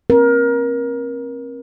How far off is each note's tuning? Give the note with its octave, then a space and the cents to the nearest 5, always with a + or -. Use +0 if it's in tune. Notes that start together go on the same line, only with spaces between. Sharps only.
C4 +40 A#4 +25